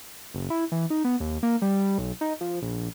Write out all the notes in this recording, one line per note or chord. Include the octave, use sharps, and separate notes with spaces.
F#1
E4
E3
D#4
B3
D#2
A#3
G3
B1
D#4
F3
A#1